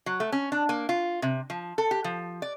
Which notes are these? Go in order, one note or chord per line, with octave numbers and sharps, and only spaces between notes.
F#3
A3
C#4
D4
A#3
F4
C3
F3
A4
G4
F3
D5